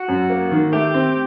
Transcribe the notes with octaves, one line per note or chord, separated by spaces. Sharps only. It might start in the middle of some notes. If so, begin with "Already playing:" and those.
Already playing: F#4
F#2
A#3
D#3
A3 G4
C4